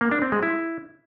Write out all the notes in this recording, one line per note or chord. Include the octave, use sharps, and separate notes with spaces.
A#3
D4
C4
G#3
E4